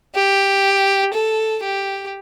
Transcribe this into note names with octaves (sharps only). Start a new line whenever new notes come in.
G4
A4
G4